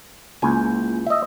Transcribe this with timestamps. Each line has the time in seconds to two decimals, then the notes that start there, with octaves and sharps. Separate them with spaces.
0.42 C#2 A#3 E4 G#5 G6
1.07 D#5 E5